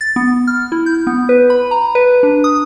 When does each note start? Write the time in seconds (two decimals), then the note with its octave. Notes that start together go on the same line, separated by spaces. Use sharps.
0.01 A6
0.16 B3
0.47 F6
0.72 E4
0.86 G6
1.07 B3
1.29 B4
1.50 B5
1.71 A#5
1.95 B4
2.23 D4
2.44 D#6